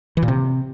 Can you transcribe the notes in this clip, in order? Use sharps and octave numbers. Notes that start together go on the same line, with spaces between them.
E3
A#2
C3